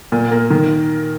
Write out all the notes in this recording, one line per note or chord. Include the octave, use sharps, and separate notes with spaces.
A#2
A#3
D#3